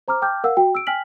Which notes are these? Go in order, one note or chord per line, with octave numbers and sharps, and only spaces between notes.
C5 A#5 D6 F6
G5 A5 D6 F6 G6
A#4 F5 F#5 E6
F#4 G5
E6 D7
G5 G#5 F6 B6 F#7